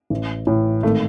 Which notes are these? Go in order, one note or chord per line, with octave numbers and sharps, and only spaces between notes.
A1
A2 E3
G#1 A3